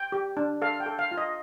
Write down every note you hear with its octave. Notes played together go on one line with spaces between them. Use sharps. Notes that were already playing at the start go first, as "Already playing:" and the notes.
Already playing: G5
G4
D4
A4 F5
G5
A4
F5
F4
D#5